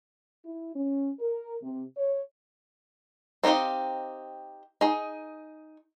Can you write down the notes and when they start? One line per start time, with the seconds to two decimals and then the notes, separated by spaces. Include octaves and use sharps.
0.45 E4
0.75 C#4
1.20 A#4
1.63 C3
1.97 C#5
3.44 C4 D#4 G4 D#5 F5
4.81 D#4 G#4